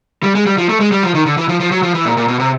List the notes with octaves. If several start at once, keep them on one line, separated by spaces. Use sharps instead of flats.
G3
G#3
G3
F3
A3
G#3
G3
F3
D#3
D3
E3
F3
F3
F#3
F3
E3
A#2
A#2
B2
C3